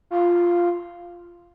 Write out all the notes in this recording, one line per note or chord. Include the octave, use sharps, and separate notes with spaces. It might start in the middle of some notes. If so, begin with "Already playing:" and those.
F4